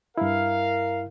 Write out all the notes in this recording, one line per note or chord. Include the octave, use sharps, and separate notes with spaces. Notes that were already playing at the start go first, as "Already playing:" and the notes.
G2 E4 A#4 F5